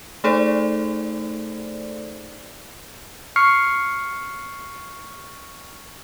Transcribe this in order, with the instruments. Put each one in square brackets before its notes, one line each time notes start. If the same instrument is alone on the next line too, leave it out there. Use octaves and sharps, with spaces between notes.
[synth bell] A3 D#4 G#4 A4 C5 D5
[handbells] C#6 F6 C7 C#7